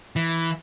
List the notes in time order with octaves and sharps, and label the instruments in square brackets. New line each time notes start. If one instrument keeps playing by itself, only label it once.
[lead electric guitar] E3